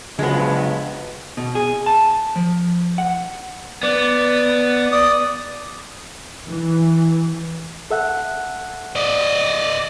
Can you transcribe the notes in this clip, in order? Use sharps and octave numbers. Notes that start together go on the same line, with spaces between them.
G2 C#3 F3 F#3 G#3 B3
B2
G#4
A5
F3
F#5
B3 D5
D5 D#6
E3
A4 E5 F#5
D5 D#5